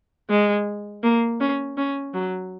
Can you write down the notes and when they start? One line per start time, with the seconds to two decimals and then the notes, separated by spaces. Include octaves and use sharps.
0.30 G#3
1.03 A#3
1.40 C#4
1.78 C#4
2.14 F#3